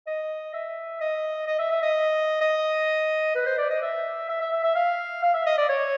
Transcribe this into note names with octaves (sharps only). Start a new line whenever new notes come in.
D#5
E5
D#5
D#5
E5
E5
D#5
D#5
B4
C5
D5
D#5
E5
E5
E5
E5
E5
F5
F5
E5
D#5
D5
C#5